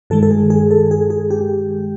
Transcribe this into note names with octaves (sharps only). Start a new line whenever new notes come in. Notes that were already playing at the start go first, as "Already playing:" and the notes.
G2 D#3 G#3 A4
A4
G#4
G#4
A4
G#4
G#4
G4